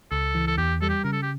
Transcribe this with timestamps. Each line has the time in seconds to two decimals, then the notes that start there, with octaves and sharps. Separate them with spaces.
0.11 C#2 A4
0.35 E3
0.47 A4
0.58 E2 G4
0.82 G3 A4
0.89 G4
1.04 C#3 A#4
1.13 A4
1.22 G4